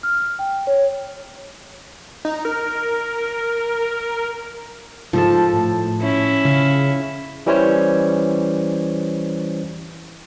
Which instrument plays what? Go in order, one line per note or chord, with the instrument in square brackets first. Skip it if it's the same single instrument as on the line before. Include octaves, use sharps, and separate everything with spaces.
[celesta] F6
G5
C#5
[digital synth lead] D#4
A#4
[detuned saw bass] G#2 [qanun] F3 A4 A5
[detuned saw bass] A2
[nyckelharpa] C#4 E4
[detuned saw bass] C#3 [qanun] F5
[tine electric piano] E3 G3 C#4 E4 C5 C#5